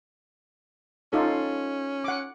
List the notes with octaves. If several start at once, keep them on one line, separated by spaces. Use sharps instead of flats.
C#4 D#4 F4 A4
F#5 D6